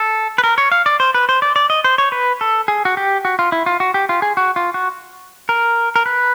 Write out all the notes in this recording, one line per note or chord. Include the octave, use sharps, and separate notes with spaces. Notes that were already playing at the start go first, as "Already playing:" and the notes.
Already playing: A4
B4
A#4
C#5
F5
D5
C5
B4
C5
D5
D5
D#5
C5
C#5
B4
A4
G#4
F#4
G4
F#4
F4
E4
F4
F#4
G4
F4
G#4
F#4
F4
F#4
A#4
A#4
B4